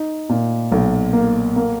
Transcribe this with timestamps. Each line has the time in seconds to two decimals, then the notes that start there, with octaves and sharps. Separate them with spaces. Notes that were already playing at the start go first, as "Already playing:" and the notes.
Already playing: D#4
0.29 A#2
0.72 B1
1.13 A#3
1.56 A#3